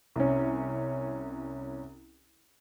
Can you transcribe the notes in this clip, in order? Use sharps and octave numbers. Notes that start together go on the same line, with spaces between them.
C2 C#4